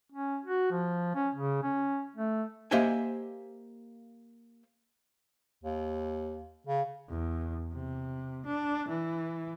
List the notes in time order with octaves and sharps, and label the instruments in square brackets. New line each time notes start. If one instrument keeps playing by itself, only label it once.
[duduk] C#4
F#4
F3
C#4
C#3
C#4
A3
[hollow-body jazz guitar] A#3 G4 C5 D#5 E5 G#5
[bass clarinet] D#2
C#3
[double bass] E2
C3
D4
E3